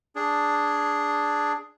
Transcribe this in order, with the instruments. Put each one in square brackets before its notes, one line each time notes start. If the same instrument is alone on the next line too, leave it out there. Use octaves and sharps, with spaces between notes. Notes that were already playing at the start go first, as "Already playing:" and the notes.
[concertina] D4 G#4